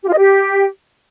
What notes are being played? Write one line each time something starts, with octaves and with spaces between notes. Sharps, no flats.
G4
F4
D#5
G4